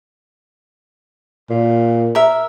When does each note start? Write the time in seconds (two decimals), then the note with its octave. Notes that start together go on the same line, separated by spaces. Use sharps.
1.50 A#2
2.15 A#4 E5